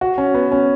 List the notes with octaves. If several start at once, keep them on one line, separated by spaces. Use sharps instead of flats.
F#4
C#4
B3
C#4